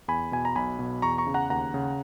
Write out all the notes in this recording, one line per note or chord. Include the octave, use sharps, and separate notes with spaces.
E2 G#5 B5
B2 G#5
A#5
B1 G#5 B5
B2
E2 A#5 C#6
A#5 C#6
C#3
F#5 A#5
D#2 F#5 A#5
C#3